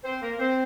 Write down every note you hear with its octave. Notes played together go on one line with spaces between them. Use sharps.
C4 C5
A#3 A#4
C4 C5